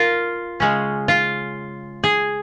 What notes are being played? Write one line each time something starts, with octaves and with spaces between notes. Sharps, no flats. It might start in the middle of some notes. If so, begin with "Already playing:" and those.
Already playing: F4 A#4
C#3 G#3 C#4
F4
G#4